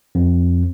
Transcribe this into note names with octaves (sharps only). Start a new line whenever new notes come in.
F2